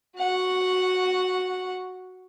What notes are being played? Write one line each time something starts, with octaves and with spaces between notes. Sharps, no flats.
F#4 F#5